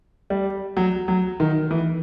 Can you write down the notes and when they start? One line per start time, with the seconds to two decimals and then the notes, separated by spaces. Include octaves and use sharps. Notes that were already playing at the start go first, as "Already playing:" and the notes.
0.30 G3
0.77 F#3
1.08 F#3
1.40 D#3
1.71 E3